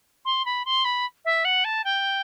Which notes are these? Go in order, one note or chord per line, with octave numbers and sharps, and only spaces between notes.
C6
B5
C6
B5
E5
F#5
A5
G5